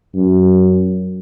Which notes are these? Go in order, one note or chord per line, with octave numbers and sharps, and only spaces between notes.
F#2